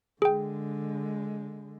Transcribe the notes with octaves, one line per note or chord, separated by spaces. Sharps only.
D3 G#3 G#4 G5